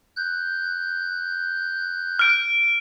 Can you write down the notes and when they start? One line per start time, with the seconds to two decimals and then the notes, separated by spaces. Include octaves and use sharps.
0.16 F#6 G6
2.19 F6 D7